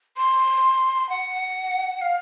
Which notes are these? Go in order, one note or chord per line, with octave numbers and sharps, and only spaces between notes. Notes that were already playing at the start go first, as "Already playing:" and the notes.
C6
F#5
F5